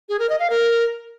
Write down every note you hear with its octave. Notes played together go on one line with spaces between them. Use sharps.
G#4
A#4
D#5
F5
A#4